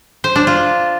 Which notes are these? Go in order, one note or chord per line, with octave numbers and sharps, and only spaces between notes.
C5
D4
F4